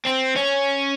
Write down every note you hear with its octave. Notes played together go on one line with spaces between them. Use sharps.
C4
C#4